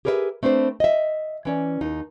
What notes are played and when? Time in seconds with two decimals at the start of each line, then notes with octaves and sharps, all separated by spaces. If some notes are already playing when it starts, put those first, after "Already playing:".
0.05 G4 G#4 A#4 B4 C#5 E5
0.43 A3 C4 D4 B4 C5
0.80 D#5 E5
1.45 E3 C#4 D5
1.81 D#2 D#4